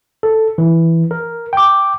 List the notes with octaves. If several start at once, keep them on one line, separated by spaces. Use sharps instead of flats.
A4
E3
A#4
G5 D6